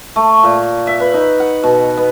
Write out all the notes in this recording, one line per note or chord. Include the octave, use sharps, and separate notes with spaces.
A3
A#2
E5
B4
D#4
F#5
B2
B3